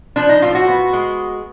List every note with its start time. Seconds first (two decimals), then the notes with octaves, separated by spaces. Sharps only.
0.16 F3 D4
0.29 D#4
0.42 A2 F4
0.55 F#4
0.68 B3
0.93 G#3